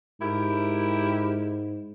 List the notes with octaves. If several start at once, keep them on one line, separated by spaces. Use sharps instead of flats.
G#2 E4 G4 A#4